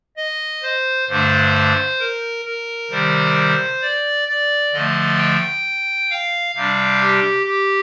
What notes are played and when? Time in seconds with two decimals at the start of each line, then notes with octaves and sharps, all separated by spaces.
0.17 D#5
0.62 C5
1.08 G2 D3 A3 D4 C5
2.00 A#4
2.45 A#4
2.91 C3 D#3 G3 C5
3.82 D5
4.28 D5
4.73 D3 F3 A3 D#5
5.18 G5
6.10 F5
6.55 C3 G3 D4 F5
7.01 G4
7.46 G4